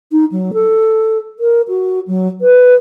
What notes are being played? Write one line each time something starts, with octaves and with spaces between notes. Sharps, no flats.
D#4
F#3
A4
A#4
F#4
F#3
B4